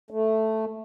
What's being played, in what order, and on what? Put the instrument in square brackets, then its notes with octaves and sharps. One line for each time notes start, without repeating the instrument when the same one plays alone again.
[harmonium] A3